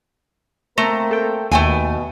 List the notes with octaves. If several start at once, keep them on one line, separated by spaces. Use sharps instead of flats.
A3 A#3 C4 A#4 A#5
A4 G5
D#2 B2 A3 G5 G#5